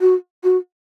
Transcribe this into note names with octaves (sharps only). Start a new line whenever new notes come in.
F#4
F#4